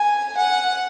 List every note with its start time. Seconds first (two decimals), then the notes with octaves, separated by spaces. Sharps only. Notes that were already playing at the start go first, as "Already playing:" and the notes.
Already playing: G#5
0.37 F#5